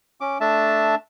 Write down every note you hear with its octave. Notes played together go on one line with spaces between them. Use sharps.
C#4 D6
A3 D4 E5 A5